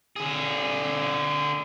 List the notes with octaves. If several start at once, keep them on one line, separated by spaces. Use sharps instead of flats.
D3 G#4